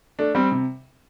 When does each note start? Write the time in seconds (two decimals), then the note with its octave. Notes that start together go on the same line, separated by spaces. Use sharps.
0.19 A3 D4
0.35 G3 C4
0.51 C3